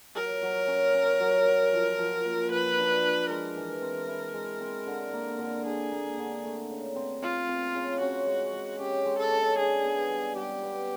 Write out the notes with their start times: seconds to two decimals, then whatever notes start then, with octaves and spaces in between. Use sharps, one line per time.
0.15 F#3 A#4
0.42 F#3
0.68 C#4
0.94 C#4
1.20 F#3
1.47 F#3
1.73 F3
1.99 F3
2.25 A#3
2.51 F3 B4
2.77 D4
3.03 D4
3.30 G#3 A#4
3.56 E3
3.82 C4
4.08 E4
4.34 G#3
4.61 C4
4.87 D3
5.13 A#3
5.39 D3
5.65 D4 G#4
5.91 A#3
6.18 D3
6.44 A3
6.70 C#3
6.96 C4
7.22 C4 F4
7.49 C4
7.74 C#3
8.00 C#4 F#4
8.27 G#3
8.53 G#3
8.79 C#4 G4
9.05 G#3
9.18 A4
9.31 C#4
9.57 D4 G#4
9.84 B3
10.10 G3
10.36 G3 G4
10.62 B3